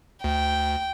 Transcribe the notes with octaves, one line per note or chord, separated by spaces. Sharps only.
D2 G5